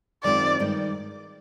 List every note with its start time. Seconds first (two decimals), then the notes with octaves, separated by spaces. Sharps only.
0.24 F#2 D#3 G#3 C4 F4 D5
0.59 G2 D#3 G#3